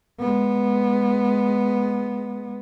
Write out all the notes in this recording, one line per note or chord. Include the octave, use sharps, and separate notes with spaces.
G#3 B3